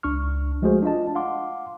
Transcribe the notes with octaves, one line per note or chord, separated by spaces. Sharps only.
C#2 D4 C#6 F6
F3 G#3 A3 F#4 G#4 C5
D4 F4 D#5 A5
F5 F#5 C6 D6